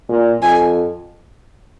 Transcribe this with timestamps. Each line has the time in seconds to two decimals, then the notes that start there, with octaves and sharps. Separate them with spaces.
0.09 A#2
0.41 F2 G#5